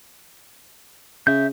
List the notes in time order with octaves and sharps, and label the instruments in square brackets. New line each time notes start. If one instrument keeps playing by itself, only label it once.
[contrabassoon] C#3 [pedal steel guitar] E5 G6